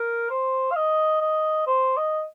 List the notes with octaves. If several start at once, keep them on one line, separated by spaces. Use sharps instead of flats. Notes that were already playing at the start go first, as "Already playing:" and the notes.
Already playing: A#4
C5
F5
D#5
D#5
C5
D#5